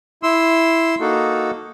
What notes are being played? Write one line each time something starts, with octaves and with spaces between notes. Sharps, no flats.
E4 C6 E6
A#3 D#4 F#4 A4